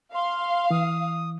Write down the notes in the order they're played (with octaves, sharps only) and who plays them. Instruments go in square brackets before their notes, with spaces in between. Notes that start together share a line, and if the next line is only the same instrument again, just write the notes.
[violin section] F5 [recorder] C6
[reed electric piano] E3 [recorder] D#6